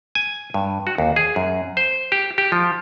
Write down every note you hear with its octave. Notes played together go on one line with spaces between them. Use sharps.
G#5
G2
F#4
D#2
G#4
F#2
C5
G4
G4
F3